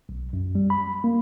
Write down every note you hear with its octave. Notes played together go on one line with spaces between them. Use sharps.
B1
F#2
G3
B5
A#3